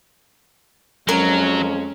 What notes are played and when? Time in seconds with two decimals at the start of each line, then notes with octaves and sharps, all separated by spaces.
1.09 F2 F#3 G#3 C#4 A#4